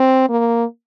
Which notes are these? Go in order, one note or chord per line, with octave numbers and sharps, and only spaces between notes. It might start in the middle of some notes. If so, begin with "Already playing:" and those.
Already playing: C4
A#3